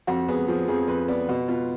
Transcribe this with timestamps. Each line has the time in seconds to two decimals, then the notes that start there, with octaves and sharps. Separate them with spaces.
0.07 F2 F#4
0.28 B3 G#4
0.47 F3 G#4
0.68 F2 G#4
0.88 F2 B4
1.08 B3 D5
1.29 B2
1.48 B3 F4